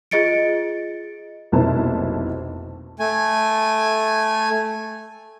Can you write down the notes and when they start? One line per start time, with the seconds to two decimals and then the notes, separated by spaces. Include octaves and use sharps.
0.11 F4 G#4 D#5 A6 C#7 D7
1.52 F1 B1 A#3 E4 C5 A5
2.99 A3 G#5